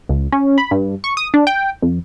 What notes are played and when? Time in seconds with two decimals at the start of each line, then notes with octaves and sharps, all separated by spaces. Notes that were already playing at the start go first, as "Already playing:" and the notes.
0.09 C#2
0.32 C#4
0.58 B5
0.71 G2
1.04 C#6
1.17 D#6
1.34 D4
1.47 G5
1.82 F2